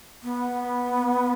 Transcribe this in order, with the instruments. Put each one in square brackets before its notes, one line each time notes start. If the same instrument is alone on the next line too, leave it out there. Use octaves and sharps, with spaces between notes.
[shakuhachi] B3